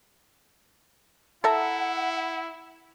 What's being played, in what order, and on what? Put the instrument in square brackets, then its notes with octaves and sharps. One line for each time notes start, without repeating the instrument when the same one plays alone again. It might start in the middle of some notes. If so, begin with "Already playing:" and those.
[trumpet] E4 [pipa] A4 E5 A#5 [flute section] F#5